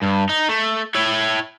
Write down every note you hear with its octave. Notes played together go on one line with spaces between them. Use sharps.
G2
D#4
A3
E4 C#5